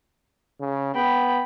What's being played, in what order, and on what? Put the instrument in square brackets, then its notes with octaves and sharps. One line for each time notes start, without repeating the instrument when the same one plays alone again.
[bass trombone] C#3
[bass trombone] B3 [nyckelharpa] G5 B5